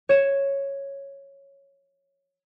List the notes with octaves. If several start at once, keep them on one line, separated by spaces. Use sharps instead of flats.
C#5 E7